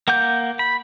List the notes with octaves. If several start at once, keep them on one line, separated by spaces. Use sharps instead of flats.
A#3 F#5 D6 G6
B5